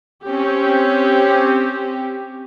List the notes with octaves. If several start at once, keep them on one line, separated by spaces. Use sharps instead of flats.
C4 C#4 G4